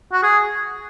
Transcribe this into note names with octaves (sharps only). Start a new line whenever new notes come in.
F#4
G#4